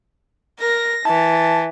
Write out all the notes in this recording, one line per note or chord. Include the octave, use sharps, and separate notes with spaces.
A#4 A#6
E3 A5